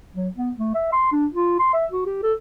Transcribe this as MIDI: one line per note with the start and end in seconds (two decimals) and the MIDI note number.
0.16 0.29 54
0.37 0.51 59
0.57 0.72 57
0.75 0.92 76
0.92 1.08 84
1.12 1.26 62
1.33 1.58 65
1.59 1.72 84
1.74 1.86 76
1.92 2.05 66
2.06 2.22 67
2.23 2.33 69